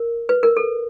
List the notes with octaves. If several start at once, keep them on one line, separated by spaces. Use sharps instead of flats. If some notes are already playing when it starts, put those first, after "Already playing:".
Already playing: A#4
B4
A#4
A4